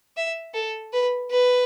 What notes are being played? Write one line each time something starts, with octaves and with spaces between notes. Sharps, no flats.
E5
A4
B4
B4